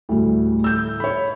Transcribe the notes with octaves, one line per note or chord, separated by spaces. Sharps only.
D2 A2 G3
E6 G6
C#5 B5